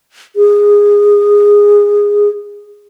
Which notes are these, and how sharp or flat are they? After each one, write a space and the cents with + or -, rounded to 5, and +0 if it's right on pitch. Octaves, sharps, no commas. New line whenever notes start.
G#4 -15